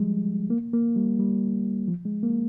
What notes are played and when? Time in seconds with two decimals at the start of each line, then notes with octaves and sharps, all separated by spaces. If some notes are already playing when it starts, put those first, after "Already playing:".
Already playing: F3 G3 G#3
0.50 A#3
0.73 A#3
0.96 G3
1.19 G3
1.88 F3
2.05 G#3
2.23 A#3